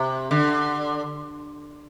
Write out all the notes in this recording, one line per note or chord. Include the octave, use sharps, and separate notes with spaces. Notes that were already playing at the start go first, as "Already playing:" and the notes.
Already playing: C3
D3